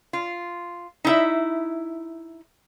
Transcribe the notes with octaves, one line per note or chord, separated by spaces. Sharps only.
F4
D#4 E4 E5